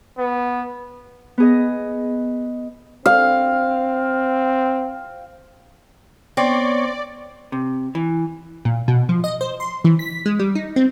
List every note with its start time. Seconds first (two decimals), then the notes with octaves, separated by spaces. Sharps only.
0.18 B3
1.38 B3 G#4 D#5
3.06 C4 F5
6.37 B3 C4 C#5 D5
7.52 C3
7.95 E3
8.65 A#2
8.88 B2
9.09 F3
9.24 D#5
9.41 C5
9.60 C6
9.84 E3
9.99 B6
10.26 G#3
10.40 G3
10.55 D#4
10.76 C4